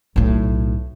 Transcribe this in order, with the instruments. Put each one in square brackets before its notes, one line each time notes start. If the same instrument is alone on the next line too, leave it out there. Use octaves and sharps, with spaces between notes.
[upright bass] B1 A2